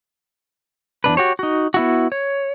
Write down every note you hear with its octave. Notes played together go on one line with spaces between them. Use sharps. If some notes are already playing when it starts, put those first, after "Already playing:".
E2 C3 D4 B4
F#4 G4 C#5
D#4 F#4
B3 E4 F#4
C#5